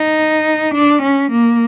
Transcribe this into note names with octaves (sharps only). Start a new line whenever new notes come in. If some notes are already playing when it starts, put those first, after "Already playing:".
Already playing: D#4
D4
C#4
A#3